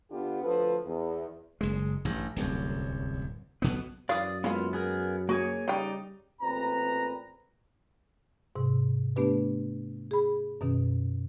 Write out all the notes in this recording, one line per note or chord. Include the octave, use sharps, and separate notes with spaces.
D3 B3 D4 F4 G4
D2 F3 A4 B4
E2
F#1 G#3
A1 G2
D1 C2 F#2
B1 B2 B3
F#2 E3 A#4 D5 F5 D#6
G#3 A#3 B3 E4 F4
B3 G#4 A#4
A#3 F#4 G#4 C#5
C#3 G3 D#4 D5 G5
A1 A#2 C4 B4 A#5
G#2 C3
A3 B3 D4 G4 B4
G#4 B5
F#2 B2 D#3 C#4